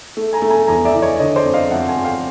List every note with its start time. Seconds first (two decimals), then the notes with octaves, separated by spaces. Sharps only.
0.17 A3
0.33 G#5 A#5
0.42 A3
0.50 G#5 A#5
0.67 E2 G#5 A#5
0.85 D5 E5
0.94 E3
1.02 C#5 D#5
1.19 D3 C#5 D#5
1.36 C5 D5
1.45 F2
1.54 D#5 F5
1.70 F2 E5 F#5
1.88 F#5 G#5
1.96 F2
2.05 F5 G5